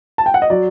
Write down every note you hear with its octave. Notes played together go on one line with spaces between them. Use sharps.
A5
G5
F#5
D#5
F#3 D5